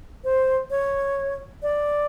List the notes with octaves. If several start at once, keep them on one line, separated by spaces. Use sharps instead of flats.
C5
C#5
D5